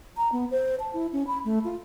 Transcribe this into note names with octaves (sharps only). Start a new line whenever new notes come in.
A#5
B3
C5
A5
E4
C#4
B5
A3
F4